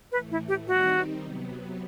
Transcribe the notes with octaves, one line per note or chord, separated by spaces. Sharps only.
A2 E3 A3 B4
E4
G4
D#3 G3 C4 D#4 F#4
C3 F#3 B3